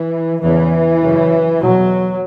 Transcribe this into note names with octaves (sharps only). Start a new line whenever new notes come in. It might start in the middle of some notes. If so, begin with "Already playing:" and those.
Already playing: E3
E2 C#3 E3
F#2 C#3
E2 B2 F#3